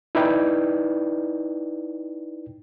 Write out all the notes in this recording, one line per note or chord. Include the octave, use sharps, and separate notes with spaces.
D#4 E4 B4 D5 G5